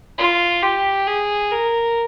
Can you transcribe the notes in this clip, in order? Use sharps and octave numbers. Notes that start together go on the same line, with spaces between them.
F4
G4
G#4
A#4